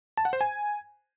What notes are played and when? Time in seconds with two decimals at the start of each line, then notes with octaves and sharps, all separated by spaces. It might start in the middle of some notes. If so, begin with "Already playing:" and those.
0.17 A5
0.25 F#5
0.33 C5
0.41 G#5